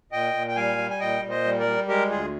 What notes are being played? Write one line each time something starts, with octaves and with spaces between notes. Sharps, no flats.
A#2 D#5 G5
A#2
G5
G3 F5 G#5
G3
G#5
A#2 D#5 G5
A#2
C5 D#5
G3
A#4 D5
G3
G#3 G4 A#4
D2 F4 G#4